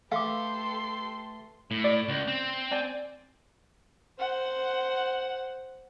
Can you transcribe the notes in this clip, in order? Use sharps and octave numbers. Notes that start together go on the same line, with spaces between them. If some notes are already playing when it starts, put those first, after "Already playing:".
A3 G4 A4 B4 F5 C6 D6
A2
D5
C#2
C4
C5 D5 G#5
C5 F#5